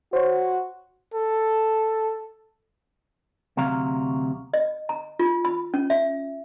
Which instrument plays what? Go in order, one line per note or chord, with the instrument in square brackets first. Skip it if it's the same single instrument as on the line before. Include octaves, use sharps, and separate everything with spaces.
[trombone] F#4 [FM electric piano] C5 C#5
[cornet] A4
[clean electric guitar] D2 C3 F#3 F5 A#5
[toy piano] D#5
A#5
F4
B5
C#4
E5